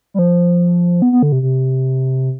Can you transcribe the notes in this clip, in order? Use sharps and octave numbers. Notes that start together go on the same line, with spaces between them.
G3
F3
B3
B3
D3
C3
C3